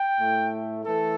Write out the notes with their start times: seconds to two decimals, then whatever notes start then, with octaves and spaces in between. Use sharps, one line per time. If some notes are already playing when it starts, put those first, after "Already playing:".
Already playing: G5
0.17 A2 A3
0.83 E3 A3 A4